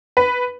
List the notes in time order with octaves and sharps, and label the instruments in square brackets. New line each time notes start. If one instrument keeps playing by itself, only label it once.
[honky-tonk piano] B4